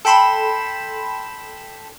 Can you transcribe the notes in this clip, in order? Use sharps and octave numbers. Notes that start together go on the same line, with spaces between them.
A4 G5 B5 C6 E7